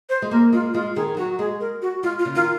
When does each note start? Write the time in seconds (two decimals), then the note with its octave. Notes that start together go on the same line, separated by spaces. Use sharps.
0.09 C5
0.22 G#3
0.31 A#3 A#4
0.52 G#3 F4
0.74 G#3 F4
0.96 D#3 G#4
1.17 F#3 F#4
1.39 G#3 G#4
1.61 A#4
1.82 F#4
2.03 G#3 F4
2.19 F4
2.25 C#3
2.35 D#3 F4